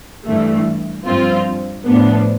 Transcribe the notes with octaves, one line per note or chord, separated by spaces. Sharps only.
G2 E3 A3
G2 F3 C4 F4
A2 F3 B3 D4